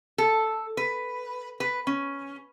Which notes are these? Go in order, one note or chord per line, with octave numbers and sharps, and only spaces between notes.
A4
B4
B4
C#4